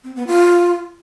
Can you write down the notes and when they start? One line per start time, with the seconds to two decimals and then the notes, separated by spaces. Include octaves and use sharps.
0.04 C4
0.15 B3
0.27 F4